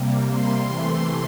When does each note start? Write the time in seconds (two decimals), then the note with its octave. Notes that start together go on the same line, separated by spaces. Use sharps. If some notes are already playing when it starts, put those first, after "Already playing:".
Already playing: C3 G3 A#3
0.27 C6
0.65 C3 E3 A3 C6